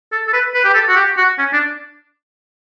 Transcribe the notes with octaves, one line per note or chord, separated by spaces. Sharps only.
A4
A4
B4
B4
G4
A4
F#4
G4
F#4
C#4
D4